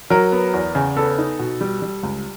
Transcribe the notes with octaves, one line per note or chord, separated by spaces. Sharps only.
F#3 A#4
B3
E2
C#3
B3 A4
D#4
B2
G3
G3
C#2